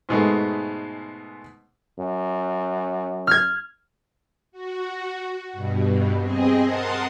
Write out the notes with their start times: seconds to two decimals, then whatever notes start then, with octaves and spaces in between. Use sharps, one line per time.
0.09 G#2 B2 G#3 A3
1.99 F#2
3.27 F6 G#6
4.52 F#4
5.53 G2 B2
6.20 C4 G#4 D#5
6.63 A#4 F#5 A5 C6 D#6